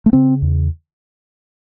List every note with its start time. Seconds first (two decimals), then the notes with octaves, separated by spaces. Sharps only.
0.06 A3
0.13 C#3 C4
0.42 E2